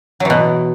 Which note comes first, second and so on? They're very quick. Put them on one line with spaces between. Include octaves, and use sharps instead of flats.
F#3 E3 B2